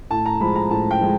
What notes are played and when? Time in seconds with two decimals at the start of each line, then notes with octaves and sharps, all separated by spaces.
0.11 A2 A5
0.26 A#5
0.40 F3 G#3 B5
0.56 A#5
0.71 A2 A5
0.91 G5
1.01 F3 G#3